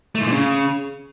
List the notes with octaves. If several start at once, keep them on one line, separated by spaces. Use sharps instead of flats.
A3
G#2
A#2
C#3